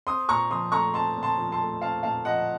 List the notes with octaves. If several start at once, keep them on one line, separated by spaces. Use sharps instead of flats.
C4 C6 D#6
A#2 A#5 C#6
F3 C6 D#6
A3 A#5 C#6
C4 A5 C6
A#2
A5 C6
F3
A5 C6
A3
C4 F5 A5
A#2 F5 A5
F3 D#5 F#5